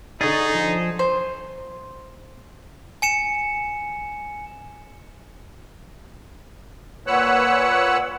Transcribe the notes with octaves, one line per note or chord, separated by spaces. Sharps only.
D3 D#4 G#4 D5 D#5 C#6 A6
F3 C5
C5
G#5 C#7 E7
A#2 B4 C#5 F#5 E6 F#6